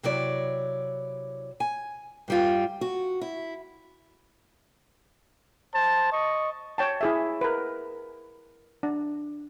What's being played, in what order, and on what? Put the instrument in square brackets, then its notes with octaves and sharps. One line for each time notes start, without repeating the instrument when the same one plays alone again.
[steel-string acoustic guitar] C3 F#3 E4 C#5 D5
G#5
G2 G3 F4
F#4
E4
[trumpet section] C5 A5
D#5 C#6
[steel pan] C#5 G5 A5
E4 G#4 E5
A#4 B4
D4